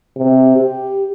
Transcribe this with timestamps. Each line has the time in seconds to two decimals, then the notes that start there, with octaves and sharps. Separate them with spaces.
0.17 C3
0.56 G4